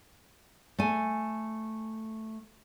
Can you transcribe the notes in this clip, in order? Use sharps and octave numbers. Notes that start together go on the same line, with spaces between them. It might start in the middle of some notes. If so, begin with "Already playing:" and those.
A3 G#5